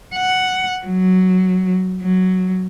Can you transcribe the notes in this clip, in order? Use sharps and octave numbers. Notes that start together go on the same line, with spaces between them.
F#5
F#3
F#3